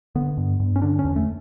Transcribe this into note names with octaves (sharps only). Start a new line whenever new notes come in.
D3 B3
G2
G2
C#4
D3 D4
C#4
E2
A3